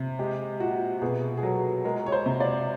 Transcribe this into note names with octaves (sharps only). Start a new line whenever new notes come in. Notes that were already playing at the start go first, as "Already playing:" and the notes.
Already playing: C3
G#3 G4
A#2 F#4
B2 G#4
G#4
F#3 A4
G#3 A#4
C#5
C5
C3
D5